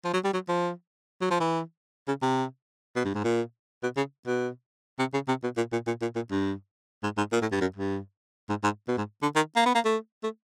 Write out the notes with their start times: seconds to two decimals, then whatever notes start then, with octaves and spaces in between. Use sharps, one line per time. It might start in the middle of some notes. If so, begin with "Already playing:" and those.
0.04 F3
0.14 F#3
0.24 G3
0.33 F#3
0.48 F3
1.21 F#3
1.31 F3
1.40 E3
2.08 C#3
2.22 C3
2.96 B2
3.05 G2
3.15 G#2
3.24 A#2
3.83 B2
3.97 C#3
4.27 B2
4.99 C3
5.14 C#3
5.28 C3
5.44 B2
5.57 A#2
5.72 A#2
5.87 A#2
6.02 A#2
6.16 A#2
6.31 G2
7.03 G#2
7.17 G#2
7.32 A#2
7.42 A2
7.52 G2
7.61 F#2
7.76 G2
8.49 G#2
8.64 G#2
8.88 B2
8.98 G#2
9.22 D3
9.36 D#3
9.56 A#3
9.66 B3
9.75 A#3
9.85 A3
10.24 A3